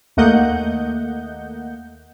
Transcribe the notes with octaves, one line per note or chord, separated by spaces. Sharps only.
D#2 A3 A#3 D#5 F#5 G6